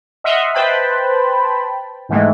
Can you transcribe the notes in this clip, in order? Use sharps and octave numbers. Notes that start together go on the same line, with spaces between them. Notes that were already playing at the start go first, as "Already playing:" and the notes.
D#5 E5 F#5 C6 D#6 F6
B4 C5 G5 A5 B5
G#2 D#3 E3 G#3 A3